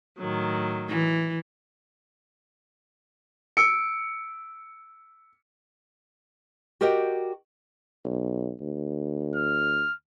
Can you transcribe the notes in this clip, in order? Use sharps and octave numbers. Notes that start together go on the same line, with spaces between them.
A2 D#3 F#3
E3
E6 C#7 D7
F#4 G4 A#4 D5 D#5 G5
B1
D2
F6